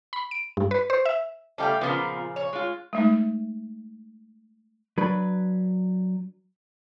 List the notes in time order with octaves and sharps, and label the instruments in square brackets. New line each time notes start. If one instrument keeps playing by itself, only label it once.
[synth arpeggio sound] B5
D7
G2
B4
C5
E5
[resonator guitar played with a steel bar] C#3 G3 A3 [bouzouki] F5 G5 A5
[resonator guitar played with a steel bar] A#2 C#3 F3 [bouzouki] B3 F4 A#4
[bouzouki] C#5
[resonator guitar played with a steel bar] G#3 F4
[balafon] G#3 A3 D#4
[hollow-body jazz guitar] F#3 D4 B4